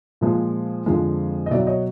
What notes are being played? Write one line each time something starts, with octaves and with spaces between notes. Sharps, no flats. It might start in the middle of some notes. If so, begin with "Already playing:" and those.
A#2 F3 G#3
F2 D3 F3 G#3
D#5
B2 F#3 D5 E5
C#5 D#5